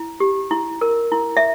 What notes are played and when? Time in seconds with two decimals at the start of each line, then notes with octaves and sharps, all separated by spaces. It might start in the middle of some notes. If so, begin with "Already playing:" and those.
Already playing: E4
0.20 G4
0.51 E4
0.81 A#4
1.12 E4
1.37 E5